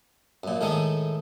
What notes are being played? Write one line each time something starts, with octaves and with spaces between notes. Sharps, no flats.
F#2 A#2
A2 D#3 G#3 A3 D#4